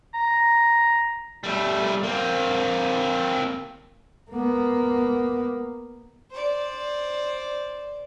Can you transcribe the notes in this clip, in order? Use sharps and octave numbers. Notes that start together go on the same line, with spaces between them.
A#5
G3 A3
A#3 C4
A#3 B3
C5 D5